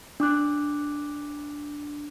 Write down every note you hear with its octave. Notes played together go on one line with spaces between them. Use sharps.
D4 D6 F#6